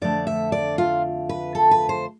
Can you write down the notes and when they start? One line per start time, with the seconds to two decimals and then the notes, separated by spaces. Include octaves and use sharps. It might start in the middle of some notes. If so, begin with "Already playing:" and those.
0.02 F2 D3 A3 D5
0.27 E5
0.52 D5
0.78 F4
1.29 B4
1.55 A4
1.71 B4
1.89 C5